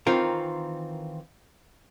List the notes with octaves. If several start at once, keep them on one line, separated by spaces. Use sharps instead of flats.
D#3 E3 C4 F4 A#4